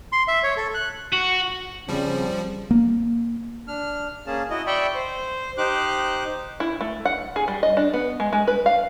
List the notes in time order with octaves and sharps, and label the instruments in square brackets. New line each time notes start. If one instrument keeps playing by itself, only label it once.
[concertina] C6
E5
C#5
A4
F#6
[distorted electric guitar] F#4
[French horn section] C#3 C4 [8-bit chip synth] F3 G3
[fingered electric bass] A#3
[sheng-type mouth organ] D4 F6
A#3 C#4 G#4 A5
E4 F#4 D#5
D5 E5 G5 B5 C#6
C5
D#4 G4 C5 D6 F#6
[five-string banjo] E4
A3
F#5
G#4
G3
D#5
D4
B3
G#3
G#3
B4
F5